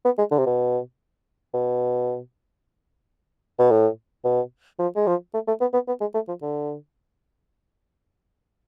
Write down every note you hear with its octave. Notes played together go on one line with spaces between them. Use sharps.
B3
G#3
D3
C3
B2
B2
B2
A2
B2
F3
G#3
F3
A3
A3
B3
B3
B3
G#3
A3
F3
D3